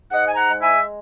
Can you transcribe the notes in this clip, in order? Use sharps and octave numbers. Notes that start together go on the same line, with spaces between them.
G#2 D#5 F#5
G#5
F#5 A#5
G#3
E5 G#5